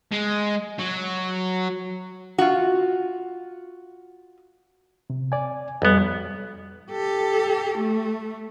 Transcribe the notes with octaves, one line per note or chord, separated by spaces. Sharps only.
G#3
F#3
F4 F#4
C3
D5 G#5
B1 F2 G3 B3
G4 A4
A3